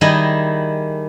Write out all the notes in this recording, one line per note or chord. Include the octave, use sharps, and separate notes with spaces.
D#3 G3 E4 G#4 D#5